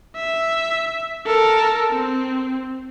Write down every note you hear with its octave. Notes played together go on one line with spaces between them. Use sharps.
E5
A4 A#4
C4